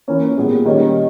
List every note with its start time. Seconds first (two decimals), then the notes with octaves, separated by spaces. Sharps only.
0.08 E3 A#3 C#4
0.36 A#2 G#3 B3 G4
0.65 D#3 G3 A#3 C#4